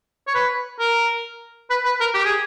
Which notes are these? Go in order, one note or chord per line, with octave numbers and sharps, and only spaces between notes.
C#5
B4
A#4
B4
B4
A#4
G4
G#4